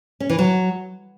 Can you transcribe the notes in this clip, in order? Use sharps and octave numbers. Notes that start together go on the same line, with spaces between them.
C#4
E3
F#3